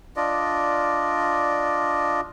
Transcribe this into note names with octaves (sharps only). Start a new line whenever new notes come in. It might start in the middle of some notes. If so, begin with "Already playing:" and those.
D4 F4 D5 D#5